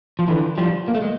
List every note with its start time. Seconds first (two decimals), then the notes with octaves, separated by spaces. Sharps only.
0.19 F3
0.28 D3 E3
0.58 F3 G3
0.88 A#3
0.95 A3
1.02 G#3